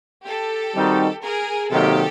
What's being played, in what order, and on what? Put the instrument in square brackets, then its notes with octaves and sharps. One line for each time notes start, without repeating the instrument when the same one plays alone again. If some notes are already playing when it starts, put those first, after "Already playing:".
[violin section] G4 A4
[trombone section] D#3 G3 C4 D#4 F#4
[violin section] G#4 A#4
[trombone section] C3 D#3 F#3 A#3 D#4 [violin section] G4 A4